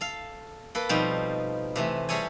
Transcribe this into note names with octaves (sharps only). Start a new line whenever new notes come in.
A4 F5
A#3 A4 B4
B2 F3 G3 C4 D#4
C3 E3 A3
G3 G#4 A4 C#5 G#5